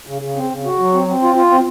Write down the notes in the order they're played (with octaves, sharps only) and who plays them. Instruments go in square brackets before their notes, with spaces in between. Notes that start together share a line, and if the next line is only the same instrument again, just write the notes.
[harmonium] C#3
C#3
C4
C#3
F#4
F#3
C4
C4
F4
F4
C4